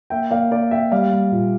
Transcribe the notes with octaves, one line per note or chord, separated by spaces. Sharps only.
A#3 E5 G5
A#3 D5 F5
A#3 D5 F5
A#3 E5 G5
G3 D5 F5
G3
A#2